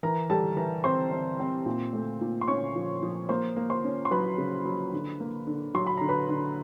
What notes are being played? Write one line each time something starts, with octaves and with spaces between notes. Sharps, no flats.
E3 A#4 A#5
G3 A4 A5
E3 A#4 A#5
C4 C5 C6
C4
C4
A#2
A3
A#2
C6
C#4 C#5 C#6
F3
F3
A#3 C5 C6
A#3
C5 C6
C#4
C6
F#3 B4 B5
C#3
F#3
D3
A#3
D3
F#3 C6
B5
D3 A#5
B4 B5
D3